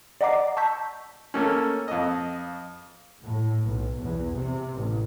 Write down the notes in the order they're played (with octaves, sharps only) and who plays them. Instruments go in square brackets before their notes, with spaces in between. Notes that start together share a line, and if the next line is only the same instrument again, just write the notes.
[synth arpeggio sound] D5 D#5 F#5 A#5 D6 C7
A5 C#6 E6 G6 B6
[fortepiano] A3 A#3 C#4
F2 D#5
[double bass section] A2
B1
E2
C3
A1